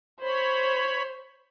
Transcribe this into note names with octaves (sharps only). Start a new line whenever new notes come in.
C5 C#5 B5